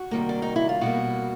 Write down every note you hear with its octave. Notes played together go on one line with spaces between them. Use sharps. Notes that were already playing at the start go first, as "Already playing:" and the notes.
Already playing: F#4
C3 D#3 G3 A#3
D4
D#4
E4
F4
B2 G3 A#3 F#4